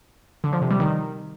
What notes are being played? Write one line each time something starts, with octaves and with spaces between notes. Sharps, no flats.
D3
F3
C3
G3
D#3